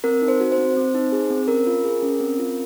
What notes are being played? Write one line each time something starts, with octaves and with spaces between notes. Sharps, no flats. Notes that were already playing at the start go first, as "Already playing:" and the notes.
C4 A#4
D#4
C5
F#4
C5
C4
C4
D#4
G#4
C4
C#4 A#4
F4
G#4
C#4
C4
F4